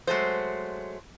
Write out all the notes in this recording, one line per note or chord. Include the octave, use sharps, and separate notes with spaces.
F#3 G#3 A3 C5